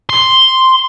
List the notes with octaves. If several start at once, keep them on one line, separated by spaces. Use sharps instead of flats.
C6